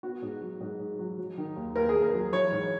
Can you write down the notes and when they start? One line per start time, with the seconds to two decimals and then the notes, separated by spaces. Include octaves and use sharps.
0.03 B3 F#4
0.22 G#2
0.41 F#3
0.61 G#2
0.80 G#2
0.99 F#3
1.18 F#3
1.38 D#3
1.56 D#2
1.76 D#2 A#4
1.89 G#4
1.95 D#2
2.03 A#4
2.14 F#3
2.33 E3 C#5
2.52 G#2